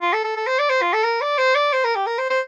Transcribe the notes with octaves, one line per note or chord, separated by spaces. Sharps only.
F4
A4
A4
A4
C5
D5
C5
F4
A4
A#4
D5
C5
D5
C5
A#4
G4
A#4
C5
C5